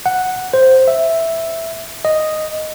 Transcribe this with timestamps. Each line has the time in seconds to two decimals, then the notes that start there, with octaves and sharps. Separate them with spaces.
0.06 F#5
0.54 C5
0.88 E5
2.05 D#5